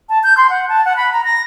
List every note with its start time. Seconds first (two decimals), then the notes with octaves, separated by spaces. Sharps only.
0.09 A5
0.24 G6
0.37 C6
0.50 F#5
0.69 A5
0.85 F#5
0.97 B5
1.12 A#5
1.25 A#6